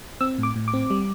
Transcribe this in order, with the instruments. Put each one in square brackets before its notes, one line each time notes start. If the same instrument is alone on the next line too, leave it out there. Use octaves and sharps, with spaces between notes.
[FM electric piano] C4 E6
A2
D6
A2
D6
C4
G3